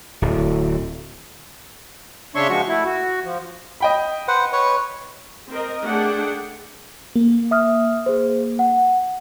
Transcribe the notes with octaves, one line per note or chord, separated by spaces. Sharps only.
D1
C#3 D4 C#5 E5 C6 C#6
F3 G#3 F#4 C#6
A3 E4
F#4
F3
D#5 G5 B5
B4 C5 F#5
B4 C#5
C4 A#4 D#5
A3 D4 G#4 F#5 G5
A#3
E5 D#6 F6
G#4 C5
F#5